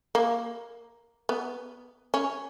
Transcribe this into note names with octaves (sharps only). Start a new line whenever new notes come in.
A#3
B3
C#4